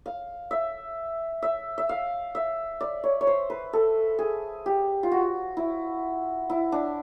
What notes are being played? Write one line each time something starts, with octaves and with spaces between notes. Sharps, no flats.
F5
E5
E5
E5
F5
E5
D5
C#5
C#5
C5
B4
A4
G#4
G4
F4
F#4
E4
E4
D4